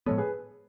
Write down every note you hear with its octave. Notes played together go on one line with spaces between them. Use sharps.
A2 F3 G#3 B3 A4 C#5
G#4 B4